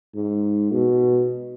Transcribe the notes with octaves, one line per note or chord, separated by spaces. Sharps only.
G#2
B2